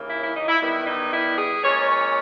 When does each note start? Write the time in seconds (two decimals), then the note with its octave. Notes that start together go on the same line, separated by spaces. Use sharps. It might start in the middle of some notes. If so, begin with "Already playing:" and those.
Already playing: D#2 C#3 E3 A#3
0.09 E4
0.23 E4
0.36 D#4
0.48 E4
0.61 E2 D#3 G3 B3 E4
0.86 D#4
1.12 E4
1.38 G#4
1.63 A#2 G#3 C#4 C#5
1.88 C#5